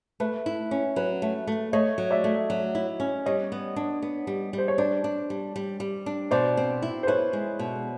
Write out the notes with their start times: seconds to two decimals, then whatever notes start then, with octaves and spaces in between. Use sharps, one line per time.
0.20 A3 B4
0.46 E4
0.71 C#4
0.96 F#3 B4
1.22 A3
1.47 A3
1.73 A3 C#5 D#5
1.98 F#3
2.11 D5 E5
2.24 A3
2.50 F#3
2.75 E4
3.00 C#4
3.26 G3 C#5 D#5
3.52 B3
3.76 D4
4.02 B3
4.27 G3
4.53 G3
4.58 C5
4.68 C#5
4.78 D4 C5 D5
5.04 D4
5.30 G3
5.56 G3
5.80 G3
6.06 D4
6.31 B2 C5 D5
6.57 C4
6.82 E4
7.03 C5
7.07 E4 B4 C#5
7.33 G#3
7.59 B2